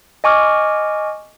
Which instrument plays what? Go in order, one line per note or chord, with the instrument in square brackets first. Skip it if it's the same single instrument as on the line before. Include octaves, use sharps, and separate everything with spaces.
[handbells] D#5 G#5 C#6 D6 F6